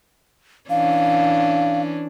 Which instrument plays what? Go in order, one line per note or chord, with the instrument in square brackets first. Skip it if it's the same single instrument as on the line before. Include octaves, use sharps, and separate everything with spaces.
[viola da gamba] E3 C#4 D4 [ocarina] F5